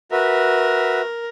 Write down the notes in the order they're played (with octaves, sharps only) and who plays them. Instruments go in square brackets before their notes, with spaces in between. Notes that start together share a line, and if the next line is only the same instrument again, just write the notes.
[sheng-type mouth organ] F#4 B4 E5 [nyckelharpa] A#4